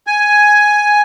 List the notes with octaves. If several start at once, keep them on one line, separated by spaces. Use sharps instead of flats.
G#5